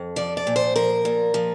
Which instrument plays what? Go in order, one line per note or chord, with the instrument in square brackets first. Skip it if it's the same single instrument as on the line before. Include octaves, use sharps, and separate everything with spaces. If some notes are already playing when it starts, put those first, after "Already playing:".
Already playing: [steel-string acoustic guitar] F2
F3 D5
D5
A#2
C5
F3 A#4
A#2
F3